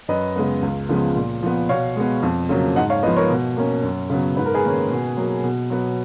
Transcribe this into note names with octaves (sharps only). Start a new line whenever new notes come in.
F#2 B4 D#5
C#3 G#3 B3
C#2
C#3 F3 G#3 B3
A#2
F3 B3
B2 C#5 F5
G#3 B3
F2
C#3 F#3 A#3
G#2 D#5 F#5
C#5 F5
F3 B3 B4 D#5
A#4 C#5
B2
A#3 C#4
F#2
C#3 F#3 B3
G#2 B4
A#4
G#4 B4
D#3 A#3 C#4
B2
F#3 A#3
B2
F#3 B3